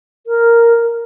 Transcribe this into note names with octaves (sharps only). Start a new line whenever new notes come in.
A#4